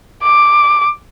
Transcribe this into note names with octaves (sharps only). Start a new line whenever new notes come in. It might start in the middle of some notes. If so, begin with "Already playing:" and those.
D6